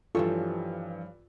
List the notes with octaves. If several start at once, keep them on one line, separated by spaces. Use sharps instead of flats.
G2 E3 F3 G3 F4 A4 C#5